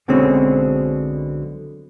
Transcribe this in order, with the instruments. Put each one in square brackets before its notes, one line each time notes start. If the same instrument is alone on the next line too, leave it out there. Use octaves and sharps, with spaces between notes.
[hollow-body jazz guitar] B1 B2 D3 G#3 C4 C#4